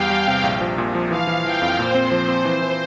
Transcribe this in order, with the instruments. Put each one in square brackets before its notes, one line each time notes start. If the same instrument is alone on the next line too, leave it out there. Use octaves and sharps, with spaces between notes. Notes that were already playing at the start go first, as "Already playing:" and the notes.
Already playing: [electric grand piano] E2 G3 [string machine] F5 G5
[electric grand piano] G3
C3
A#1
F3
A#2
F3
[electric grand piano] E3 [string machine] F5
[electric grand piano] E3
[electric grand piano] E3 [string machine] G5
[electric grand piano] F2
[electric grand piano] A#2 [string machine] C5
[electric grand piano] C4
F3
C4
E3
E3